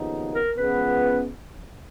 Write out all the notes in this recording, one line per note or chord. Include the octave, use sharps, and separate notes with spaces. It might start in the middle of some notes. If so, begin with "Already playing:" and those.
Already playing: D#2 C#3 F3 B3 D#4
A#4
C#2 C#3 F3 G#3 B3 B4